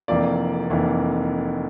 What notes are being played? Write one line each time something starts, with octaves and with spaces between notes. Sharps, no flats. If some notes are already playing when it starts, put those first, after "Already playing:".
F1 F2 E3 A#3 D5
F1 F2 E3 A#3